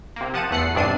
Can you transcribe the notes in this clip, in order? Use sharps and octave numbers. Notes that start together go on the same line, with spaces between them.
C3 A#3
F3 F#5 A5 D#7
E2 A3 F#5 F#6 C7 C#7
B1 G2 C3 D4 C7 D#7